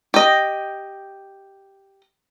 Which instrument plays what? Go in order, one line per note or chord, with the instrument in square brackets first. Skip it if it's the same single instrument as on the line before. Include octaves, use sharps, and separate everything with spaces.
[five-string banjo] G4 D#5